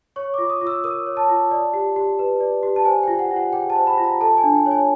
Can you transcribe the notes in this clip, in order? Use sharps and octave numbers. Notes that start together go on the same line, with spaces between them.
C#5 C#6
D6
F4
D#6
F4
E6
A#4 D#6
C#5
A5
F4
D5
G4
G4
B4
D5
G4
A5
C5 G#5
G5
F4
F#5
F4
F#5
G#4 G5
A5
C5
B5
F4
A#5
A4 A5
G#5
D4
G5
C#5
G#5